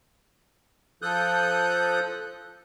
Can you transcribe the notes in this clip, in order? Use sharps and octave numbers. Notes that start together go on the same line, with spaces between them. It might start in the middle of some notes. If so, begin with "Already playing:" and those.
F3 A4 D#6 F#6 G6